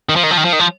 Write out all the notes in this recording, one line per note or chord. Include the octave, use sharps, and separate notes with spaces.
D#3
F3
D#3
F3
D#3
F3
D#3
F3